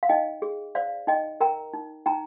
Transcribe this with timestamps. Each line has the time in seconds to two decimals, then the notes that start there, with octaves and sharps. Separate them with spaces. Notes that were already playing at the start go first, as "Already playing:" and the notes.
0.03 F5
0.09 D#4 D#5 G5
0.42 G#4
0.75 C5 D5 F5
1.07 D#4 D#5 G5
1.41 A#4 G5 A#5
1.74 D#4
2.06 D#4 G5 A#5